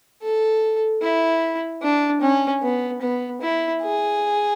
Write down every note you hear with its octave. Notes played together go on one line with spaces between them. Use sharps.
A4
E4
D4
C#4
B3
B3
E4
G#4